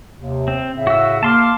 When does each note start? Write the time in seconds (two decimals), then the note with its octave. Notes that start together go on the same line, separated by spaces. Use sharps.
0.20 D#2 C3
0.48 C4
0.74 A2 C#3 E5
0.87 F#4 E6
1.23 A#3 A5 C6 D6 F6